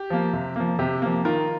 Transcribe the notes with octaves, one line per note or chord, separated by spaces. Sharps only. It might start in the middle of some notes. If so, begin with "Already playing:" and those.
Already playing: G4
F3 A#3
C3
F3 A#3
C3 G4
F3 A#3
D#3 F4 A#4